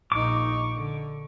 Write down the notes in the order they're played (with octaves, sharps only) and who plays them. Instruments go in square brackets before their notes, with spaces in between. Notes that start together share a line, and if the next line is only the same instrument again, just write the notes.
[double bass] A#1 D#4 [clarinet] C#6 [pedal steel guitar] D6
[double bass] D3